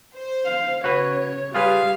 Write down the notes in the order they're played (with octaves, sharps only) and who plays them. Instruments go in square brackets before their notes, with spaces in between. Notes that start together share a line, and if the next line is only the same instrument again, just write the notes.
[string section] C5
[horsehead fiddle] F5
[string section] C#3 [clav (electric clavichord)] F#4 B4 [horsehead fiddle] C#5
[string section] G3 [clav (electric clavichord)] F4 G#4 B4 [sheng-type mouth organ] F5